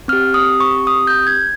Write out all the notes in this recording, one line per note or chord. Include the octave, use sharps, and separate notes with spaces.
C4 G4 F6
D#6
C#6
D#6
G6
G#6